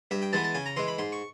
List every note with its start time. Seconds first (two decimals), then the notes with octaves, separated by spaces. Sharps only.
0.11 G2 E5
0.22 G5
0.33 E3 G#3 B3 A5
0.44 A5
0.55 C#3 G#5
0.66 A#5
0.76 E3 G#3 C6
0.88 B5
0.99 G#2 C6
1.12 C#6